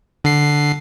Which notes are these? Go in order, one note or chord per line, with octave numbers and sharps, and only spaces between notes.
D3 C7